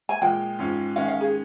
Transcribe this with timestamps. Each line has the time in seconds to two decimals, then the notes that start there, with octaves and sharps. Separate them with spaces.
0.09 G#5
0.21 A#2 F3 G#3 G5
0.59 G#2 F3 G#3 C#4 F4
0.96 D#3 G#3 C#4 F5
1.08 F5
1.21 G#4